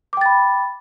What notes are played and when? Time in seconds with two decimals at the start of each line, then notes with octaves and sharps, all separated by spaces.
0.13 D6
0.17 G5
0.21 A6
0.26 B5